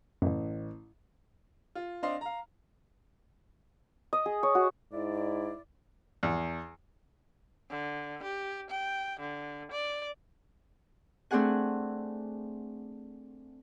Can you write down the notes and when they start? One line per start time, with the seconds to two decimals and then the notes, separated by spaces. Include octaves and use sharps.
0.22 A1 F#2 C#3
1.75 F4
2.03 C4 D4 D#5 F5 C6
2.21 F5 A#5
4.13 D#5
4.26 G#4
4.43 C#5
4.55 F#4
4.93 G#2 E4 D5
6.23 E2
7.70 D3
8.23 G4
8.70 G5
9.20 D3
9.72 D5
11.31 A3 C4 D4 G#4 F#5 G#5